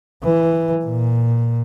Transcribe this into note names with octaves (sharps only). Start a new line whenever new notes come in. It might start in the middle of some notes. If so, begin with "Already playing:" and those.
E3
A#2